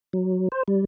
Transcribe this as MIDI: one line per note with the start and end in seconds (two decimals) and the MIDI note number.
0.13 0.48 54
0.52 0.63 72
0.68 0.85 55